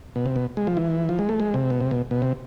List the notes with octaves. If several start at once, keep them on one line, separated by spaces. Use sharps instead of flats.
B2
C3
B2
G#3
F3
E3
F3
G#3
A3
G#3
C3
B2
C3
B2
B2
C3